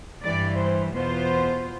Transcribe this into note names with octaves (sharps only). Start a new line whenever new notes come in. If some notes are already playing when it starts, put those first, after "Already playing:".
G2 E3 G3 D5
C5
E2 B2 B3 F4 C5